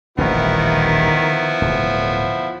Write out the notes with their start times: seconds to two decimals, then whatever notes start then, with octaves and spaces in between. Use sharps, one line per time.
0.18 D#1 A1 D#3 F3 G3 B3 E4
1.61 D1 B2